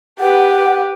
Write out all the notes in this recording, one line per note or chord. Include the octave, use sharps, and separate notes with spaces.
G4 B4 F#5